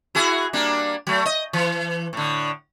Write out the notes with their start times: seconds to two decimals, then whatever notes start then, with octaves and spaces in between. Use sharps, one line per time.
0.15 E4 F#4 G#4
0.53 G3 A#3 D4
1.07 F#3 A3
1.25 D#5
1.53 E3
2.13 A2 D3